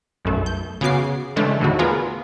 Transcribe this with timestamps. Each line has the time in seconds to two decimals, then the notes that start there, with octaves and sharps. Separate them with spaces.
0.25 B1 F#2 A3
0.46 G6
0.81 C#3 B3 F#4 D6 C7
1.36 C#3 E3 G#3 A3 D4
1.60 D#2 A2 D3 D#4 F#4
1.79 B3 F4 G#4 A#4 B4